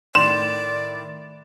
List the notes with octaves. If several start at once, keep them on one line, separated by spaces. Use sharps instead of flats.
A2 D#3 D5 C6 E7